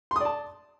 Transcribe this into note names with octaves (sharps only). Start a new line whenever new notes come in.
D5 A5 C6 D#6